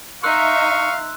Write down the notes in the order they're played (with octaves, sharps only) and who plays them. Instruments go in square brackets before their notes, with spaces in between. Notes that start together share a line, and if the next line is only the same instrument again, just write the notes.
[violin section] D#4 E5 [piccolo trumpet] F5 [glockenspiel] C6 E6 F#6 [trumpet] C#6